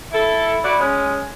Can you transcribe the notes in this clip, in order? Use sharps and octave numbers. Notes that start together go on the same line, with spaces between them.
E4 A4
E4 F#4 D5
G#3 C#4